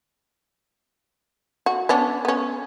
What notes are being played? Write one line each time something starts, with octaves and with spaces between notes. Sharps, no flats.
F#4
B3 C#4 D4
B3 C#4